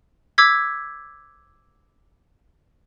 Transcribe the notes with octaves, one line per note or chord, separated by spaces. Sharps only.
D6 E6 G#6 B6